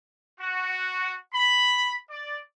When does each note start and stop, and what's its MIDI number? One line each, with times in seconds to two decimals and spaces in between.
0.40 1.12 66
1.33 1.92 83
2.09 2.37 74